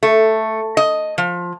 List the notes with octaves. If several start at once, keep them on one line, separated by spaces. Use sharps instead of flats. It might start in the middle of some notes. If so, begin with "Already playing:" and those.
A3
D#5
F3